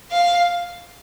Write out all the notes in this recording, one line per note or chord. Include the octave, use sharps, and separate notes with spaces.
F5